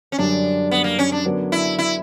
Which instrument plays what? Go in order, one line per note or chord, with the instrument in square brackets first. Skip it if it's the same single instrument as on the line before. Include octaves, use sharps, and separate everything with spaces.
[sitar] C#4
[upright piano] F#2 D3 G3 [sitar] D4
[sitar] B3
A#3
C#4
D4
[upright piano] D3 F#3 B3 D4 A#4
[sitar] E4
E4